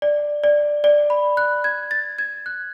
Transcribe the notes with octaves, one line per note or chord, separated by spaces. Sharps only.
D5
D5
D5
B5
F#6
G#6
A6
G#6
F#6